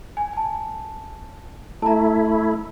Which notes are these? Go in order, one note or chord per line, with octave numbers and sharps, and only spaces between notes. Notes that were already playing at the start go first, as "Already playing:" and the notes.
G#5
G#5 A5
A3 E4 A5 A#5